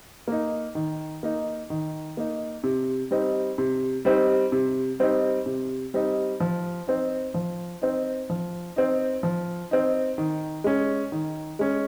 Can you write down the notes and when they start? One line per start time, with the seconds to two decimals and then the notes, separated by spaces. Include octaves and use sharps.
0.28 A#3 D#4
0.75 D#3
1.23 A#3 D#4
1.70 D#3
2.17 A#3 D#4
2.64 C3
3.11 G3 C4 D#4
3.58 C3
4.05 G3 C4 D#4
4.52 C3
5.00 G3 C4 D#4
5.46 C3
5.94 G3 C4 D#4
6.40 F3
6.87 C4 D#4
7.34 F3
7.82 C4 D#4
8.30 F3
8.76 C4 D#4
9.23 F3
9.71 C4 D#4
10.18 D#3
10.64 G#3 C#4
11.12 D#3
11.59 G#3 C#4